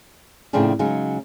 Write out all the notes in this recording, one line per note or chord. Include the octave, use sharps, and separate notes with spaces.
A2 C#3 F3 C4 D4 G#4
C#3 F#3 G#3 D#4